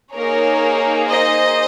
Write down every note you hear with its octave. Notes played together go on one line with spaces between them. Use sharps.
A#3 D#4 G#4 A#4 C#5
C5 D#5